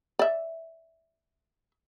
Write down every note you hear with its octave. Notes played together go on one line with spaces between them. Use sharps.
D5 E5